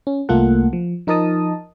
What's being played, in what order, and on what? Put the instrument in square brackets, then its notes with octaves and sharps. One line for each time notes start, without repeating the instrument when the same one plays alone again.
[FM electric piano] C#4
C2 A3 A#3 F4 A4 F#5
F3
F3 D#4 A#4 D#5 A5 D#6